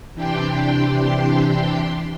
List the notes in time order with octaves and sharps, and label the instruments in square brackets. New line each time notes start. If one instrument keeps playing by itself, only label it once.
[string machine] C3 E3 D4 G4 G5 C6